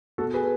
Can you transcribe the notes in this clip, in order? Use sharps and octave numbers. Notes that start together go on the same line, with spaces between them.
B2 F#4 A4
G#4 B4